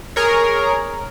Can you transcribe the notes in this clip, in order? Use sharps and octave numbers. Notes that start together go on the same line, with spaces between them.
G#4 A#4 C#5